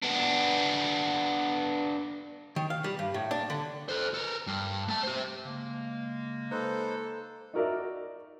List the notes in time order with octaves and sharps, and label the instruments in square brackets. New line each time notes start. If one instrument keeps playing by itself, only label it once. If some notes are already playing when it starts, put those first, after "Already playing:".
[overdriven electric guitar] B3 D4
[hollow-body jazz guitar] D#3
F5
G3
G2
A2
D4
D3
[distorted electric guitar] A4 C5
A4 A#4
G2
A3 A5
G4 C5
[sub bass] C#3 [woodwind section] G#3 A#3
[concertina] D#4 B4 C5 [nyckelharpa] A4
[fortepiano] D#4 F#4 A#4 D5 E5